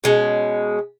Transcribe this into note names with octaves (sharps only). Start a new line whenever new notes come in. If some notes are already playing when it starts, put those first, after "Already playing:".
B2 G#3 C#4